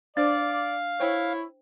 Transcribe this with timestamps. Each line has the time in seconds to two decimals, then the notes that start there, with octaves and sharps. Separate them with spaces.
0.17 D4 C5 D5 F5
1.00 E4 C5 C#5 G5